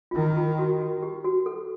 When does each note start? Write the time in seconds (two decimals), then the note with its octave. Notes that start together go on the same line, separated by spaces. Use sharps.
0.11 F4
0.15 D#3 E4
0.37 F4
0.59 F#4
0.81 F#4
1.03 G4
1.24 F#4
1.46 A4